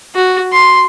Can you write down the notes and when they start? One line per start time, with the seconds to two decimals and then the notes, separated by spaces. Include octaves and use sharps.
0.15 F#4
0.53 C6